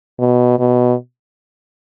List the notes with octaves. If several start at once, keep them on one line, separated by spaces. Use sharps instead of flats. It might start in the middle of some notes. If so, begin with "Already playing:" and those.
B2
B2